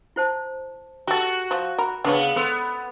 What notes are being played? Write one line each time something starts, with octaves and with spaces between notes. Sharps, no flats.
E4 C5 A5
F#4 G4 A4
F3
A#4 B5
C#3 B3 D4 B4 C#5
B3 A4 C6 E6